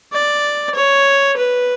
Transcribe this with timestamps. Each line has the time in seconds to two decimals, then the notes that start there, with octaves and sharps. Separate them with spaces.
0.13 D5
0.75 C#5
1.37 B4